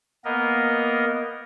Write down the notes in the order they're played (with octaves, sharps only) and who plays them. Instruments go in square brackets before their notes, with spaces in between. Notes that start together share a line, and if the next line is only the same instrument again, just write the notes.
[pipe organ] A#3 B3 A#4 D#5